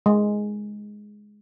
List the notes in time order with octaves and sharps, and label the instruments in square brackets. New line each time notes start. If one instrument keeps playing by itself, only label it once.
[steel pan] G#3